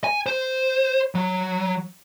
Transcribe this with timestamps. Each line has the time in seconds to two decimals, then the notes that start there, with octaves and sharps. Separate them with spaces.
0.04 G#5
0.26 C5
1.15 F#3